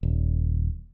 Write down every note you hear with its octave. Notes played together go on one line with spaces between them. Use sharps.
D#1